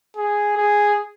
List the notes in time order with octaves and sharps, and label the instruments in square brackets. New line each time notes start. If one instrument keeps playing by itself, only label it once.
[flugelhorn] G#4
G#4